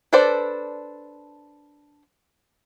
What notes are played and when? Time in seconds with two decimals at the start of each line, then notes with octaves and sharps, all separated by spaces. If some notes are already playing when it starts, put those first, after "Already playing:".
0.13 D4 A4 B4 C5 D5